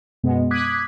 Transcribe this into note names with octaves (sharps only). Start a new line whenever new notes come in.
F#2 B2 G#3 B3
D6 D#6 F#6 G#6 B6